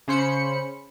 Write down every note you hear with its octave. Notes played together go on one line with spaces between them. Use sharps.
C#3 C#4 C5 B5 C#7